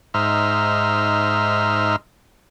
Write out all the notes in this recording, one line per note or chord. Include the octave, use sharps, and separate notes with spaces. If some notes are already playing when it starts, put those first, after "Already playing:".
G#2 D#4 C5 E5 F6